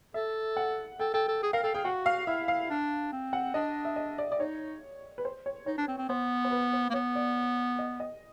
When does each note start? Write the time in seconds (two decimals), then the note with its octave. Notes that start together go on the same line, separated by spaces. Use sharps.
0.14 A4 E5
0.57 F#5
1.00 A4 G5
1.13 A4 G5
1.28 A4
1.43 G#4
1.53 A#4 F5
1.63 A4 G5
1.74 G#4 G5
1.84 F#4 F#5
2.06 F5
2.27 E4 E5
2.48 F5
2.70 D4
3.12 C4
3.33 F#5
3.54 D4 D#5
3.85 E5
3.96 D#5
4.18 D5
4.32 D5
4.39 D#4 C#5
5.18 B4
5.25 C5
5.46 C#5
5.66 D#4 C#5
5.78 D4
5.88 C4
5.98 C4
6.09 B3 C5
6.45 C5
6.51 B4
6.73 C5
6.90 A#3
6.94 B3 C#5
7.15 D5
7.79 D#5
8.00 D#5